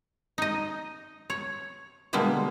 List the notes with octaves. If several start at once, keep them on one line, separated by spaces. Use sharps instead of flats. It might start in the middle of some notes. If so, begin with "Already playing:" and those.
D#4 D#5
C#5
B2 D3 G3 G#3 A#3 B3